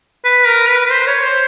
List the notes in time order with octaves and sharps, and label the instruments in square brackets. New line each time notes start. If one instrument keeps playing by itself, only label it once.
[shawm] B4
A#4
B4
B4
C5
C#5
C5